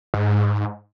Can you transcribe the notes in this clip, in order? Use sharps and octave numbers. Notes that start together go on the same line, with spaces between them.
G#2